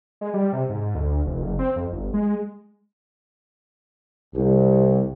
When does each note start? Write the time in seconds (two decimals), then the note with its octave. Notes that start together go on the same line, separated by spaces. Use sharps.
0.21 G#3
0.34 G3
0.53 C3
0.69 G#2
0.95 D2
1.26 F1
1.42 F#1
1.59 C4
1.76 F2
1.92 G1
2.14 G#3
4.35 C2